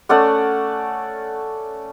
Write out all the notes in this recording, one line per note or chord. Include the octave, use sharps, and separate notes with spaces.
A3 C#4 D5 F#5